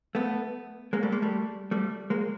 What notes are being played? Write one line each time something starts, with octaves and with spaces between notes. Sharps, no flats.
A3 B3
G#3 A#3
G3 A3
G#3 A#3
G3 A3
G3 A3
G#3 A#3